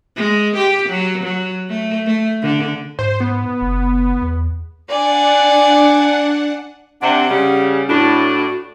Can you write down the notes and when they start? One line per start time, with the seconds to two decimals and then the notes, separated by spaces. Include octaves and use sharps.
0.16 G#3
0.56 G4
0.89 F#3
1.24 F#3
1.69 A3
2.06 A3
2.42 D3
2.99 G#2 C5
3.20 B3
3.61 F#1
4.21 E2
4.88 D4 D5 F#5 G#5
7.02 C3 D4 F#5
7.30 C#3 G3
7.89 A2 D4 F#4